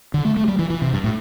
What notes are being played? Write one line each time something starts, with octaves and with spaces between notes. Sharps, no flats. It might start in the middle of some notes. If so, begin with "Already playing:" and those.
D3
A3
A3
G3
E3
E3
C3
G2
A2